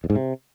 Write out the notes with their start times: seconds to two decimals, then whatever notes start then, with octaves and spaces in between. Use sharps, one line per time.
0.04 E2
0.10 G#2
0.16 C3